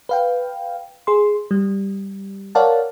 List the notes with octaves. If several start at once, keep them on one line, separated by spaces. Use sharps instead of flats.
B4 F5 G5
G#4 C6
G3
A#4 C#5 D5 F5 F#5 A5